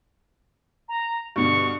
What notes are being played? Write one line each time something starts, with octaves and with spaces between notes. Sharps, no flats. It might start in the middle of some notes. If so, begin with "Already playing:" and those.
A#5
G2 B2 D3 C#6